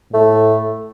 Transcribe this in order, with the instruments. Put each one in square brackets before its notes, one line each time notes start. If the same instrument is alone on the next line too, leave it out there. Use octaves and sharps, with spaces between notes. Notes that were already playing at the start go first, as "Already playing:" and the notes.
[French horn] A2 [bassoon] A3